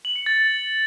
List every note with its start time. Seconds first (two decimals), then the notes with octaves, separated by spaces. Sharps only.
0.05 F#7
0.16 C#7
0.26 A6